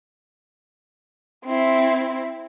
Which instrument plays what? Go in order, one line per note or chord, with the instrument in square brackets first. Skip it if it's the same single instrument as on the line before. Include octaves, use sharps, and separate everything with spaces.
[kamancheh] C4 E4